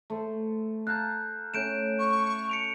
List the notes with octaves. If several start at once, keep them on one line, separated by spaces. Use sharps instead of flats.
A3 C5
F5 A5 A#5 F#6 G6
A3 C#4 G6 D7 E7
C#6
C#7 D7 F7